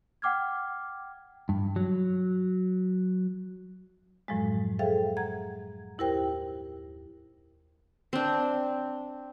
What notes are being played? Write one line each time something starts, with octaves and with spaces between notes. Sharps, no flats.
F#5 G5 D6 F6 G#6
G2
F#3
F#2 A2 F3 F#3 G#3
G#4 A4 C5 E5 F5 G5
F#5 A#5 G#6
D#2 E4 G4 A#4 C5 G5
C4 D4